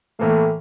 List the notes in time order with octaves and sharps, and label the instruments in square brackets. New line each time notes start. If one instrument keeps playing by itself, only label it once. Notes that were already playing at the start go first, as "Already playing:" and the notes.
[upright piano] A2 E3 A#3 [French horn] A3